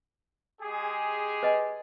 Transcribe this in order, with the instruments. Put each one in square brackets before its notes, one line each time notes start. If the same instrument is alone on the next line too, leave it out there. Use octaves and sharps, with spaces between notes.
[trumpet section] G#3 G4 G#4
[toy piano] B4 D#5 G#5